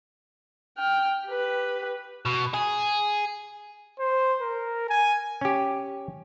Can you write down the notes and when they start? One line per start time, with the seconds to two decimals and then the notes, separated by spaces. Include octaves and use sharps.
0.78 G5 F6
1.26 G4 B4
2.26 B2
2.54 G#4
3.99 C5
4.41 A#4
4.89 G#5
5.41 C#4 G4